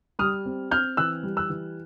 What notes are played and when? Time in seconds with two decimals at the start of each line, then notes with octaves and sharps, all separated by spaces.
0.19 G3 D#6 F6
0.46 C4
0.71 C4 F6 G6
0.97 E3 E6 F#6
1.23 G3
1.37 E6 F#6
1.50 E3